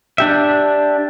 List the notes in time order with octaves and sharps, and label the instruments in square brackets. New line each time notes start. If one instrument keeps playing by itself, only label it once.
[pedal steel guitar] D4 G4 E5